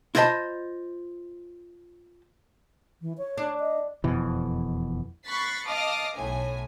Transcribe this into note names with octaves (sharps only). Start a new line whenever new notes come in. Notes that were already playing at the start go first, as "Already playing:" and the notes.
E4 F4 C5 D#5 A5 B5
E3
C#5
D4
D#5
E1 F2 B2 E3
B5 C#6 F#6 A6 B6 C7
D#5 F5 A5 D6 D#6 F6
B1 A2 G#5